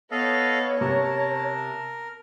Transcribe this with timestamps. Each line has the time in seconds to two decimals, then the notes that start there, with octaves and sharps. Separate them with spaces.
0.11 B3 A4 C#5 D#5 F5
0.81 C3 A#4 A5